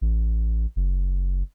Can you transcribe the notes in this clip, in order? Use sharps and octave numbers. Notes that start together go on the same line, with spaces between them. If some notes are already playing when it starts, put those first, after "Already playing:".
A1
F#1